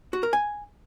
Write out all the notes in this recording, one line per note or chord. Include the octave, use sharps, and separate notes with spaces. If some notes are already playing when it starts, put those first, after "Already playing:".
F#4
A#4
G#5